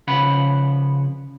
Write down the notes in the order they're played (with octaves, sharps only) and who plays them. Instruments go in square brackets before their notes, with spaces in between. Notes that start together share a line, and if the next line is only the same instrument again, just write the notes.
[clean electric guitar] C#3 F3 F#5 B5